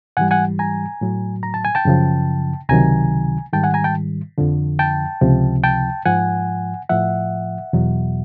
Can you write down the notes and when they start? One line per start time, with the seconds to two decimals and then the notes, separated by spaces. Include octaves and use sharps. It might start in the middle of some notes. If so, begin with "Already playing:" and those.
0.17 G#2 E3 G3 F#5 G#5
0.31 F#5 G#5
0.59 G#5 A#5
1.01 A2 F#3
1.43 A#5
1.54 A5
1.65 G#5
1.75 G5 A5
1.85 F#2 C#3 F3
2.69 C#2 C3 D#3 F#3 G#5 A#5
3.53 G#2 D#3 G3 G5 A5
3.63 F#5 G#5
3.74 G#5 A#5
3.84 G5 A5
4.38 F2 D3 F3
4.79 G5 A5
5.21 C#2 C3 F3
5.64 G5 A5
6.05 G#2 F3 F#5 G#5
6.89 A2 F3 E5 F#5
7.73 E2 B2 F#3